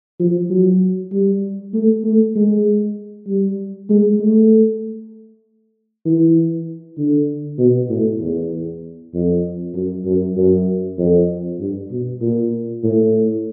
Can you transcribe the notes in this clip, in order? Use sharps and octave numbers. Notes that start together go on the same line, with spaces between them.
F3
F#3
G3
A3
A3
G#3
G3
G#3
A3
E3
D3
B2
A2
E2
F2
F#2
F#2
F#2
F2
G2
B2
A#2
A2